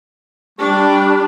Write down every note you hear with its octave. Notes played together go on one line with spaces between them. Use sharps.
G3 D4 G4 C#6